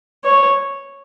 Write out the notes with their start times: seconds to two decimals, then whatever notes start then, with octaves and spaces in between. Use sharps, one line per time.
0.24 C#5